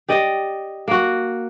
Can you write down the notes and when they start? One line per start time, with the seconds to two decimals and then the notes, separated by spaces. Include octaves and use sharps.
0.08 G4 D5 D#5
0.88 A#3 F#4